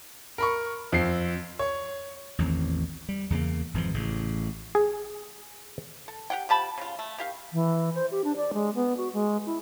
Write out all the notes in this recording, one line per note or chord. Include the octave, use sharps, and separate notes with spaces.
A#4 B5 C#6
F2 C4 C7
C#5
A1 E2 D#3 C4
G3
E2 C#3 A3 A#3
G#1 F2 E3 F3
A1 A2 C#3
G#4
A4
G4 F#5 G5
F3 G4 A5 B5
C#3 F4
A3
D#3 G4 F5
E3
C5
G4
D4
D5
G#3
B3
F#4
G#3
E4